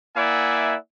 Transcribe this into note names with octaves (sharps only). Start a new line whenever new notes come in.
A#3 E4 D5 E5 F#5 G#5